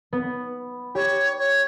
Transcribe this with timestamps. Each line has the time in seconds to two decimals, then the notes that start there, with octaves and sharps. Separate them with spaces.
0.13 B3
0.95 G4 C#5
1.38 C#5